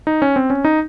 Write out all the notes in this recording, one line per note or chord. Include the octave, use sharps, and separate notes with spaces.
D#4
C#4
C4
C#4
D#4